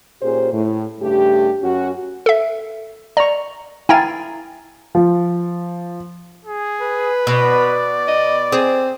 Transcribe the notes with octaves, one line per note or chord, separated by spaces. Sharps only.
A#2 C#4 G4 G#4 C5
A2
G2 C#3 A3 G4
F#2 C#4 F#4
A4 E5
D5 A#5 C#6
E4 F5 G5 G#5 A#5 A6
F3
G#4
B4
B2 D5
D#5
C4 G#4